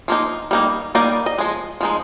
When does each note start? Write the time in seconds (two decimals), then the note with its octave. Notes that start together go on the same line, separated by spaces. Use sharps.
0.08 F3 A#3 D#4
0.51 G3 A#3 D#4
0.95 G3 A#3 D#4 D5
1.26 D#5
1.38 F3 G#3
1.81 F3 G#3 D#4